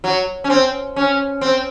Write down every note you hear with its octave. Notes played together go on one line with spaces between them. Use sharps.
F#3
C#4
C4
C#4
C4